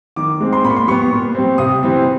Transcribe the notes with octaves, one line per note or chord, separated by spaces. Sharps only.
D#3 D6
G#3 C4
C6
A#2 B5
C#6
C6
G3 B3 C#6
A#2
G3 C4
C3 D#6
E3 G3 C4